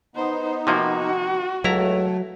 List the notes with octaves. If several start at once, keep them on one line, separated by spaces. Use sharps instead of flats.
B3 D#4 C5
C3 F3 A#3 F#4
C#2 F#3 A3 E4 A#5